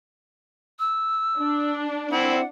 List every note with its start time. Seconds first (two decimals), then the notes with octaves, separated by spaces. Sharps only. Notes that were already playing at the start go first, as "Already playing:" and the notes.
0.79 E6
1.38 D4
2.11 C4 E4 F#5